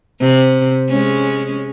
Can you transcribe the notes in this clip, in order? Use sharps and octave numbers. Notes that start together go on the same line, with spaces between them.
C3
G#3 C#4